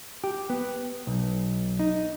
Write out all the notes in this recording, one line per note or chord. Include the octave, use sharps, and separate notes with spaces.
G4
B3
B1
D#4